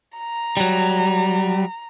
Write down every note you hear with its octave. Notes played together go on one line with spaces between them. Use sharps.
A#5
F#3 G3